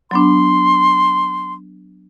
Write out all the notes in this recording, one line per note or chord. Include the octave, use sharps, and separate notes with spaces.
F#3 B3 D4 C6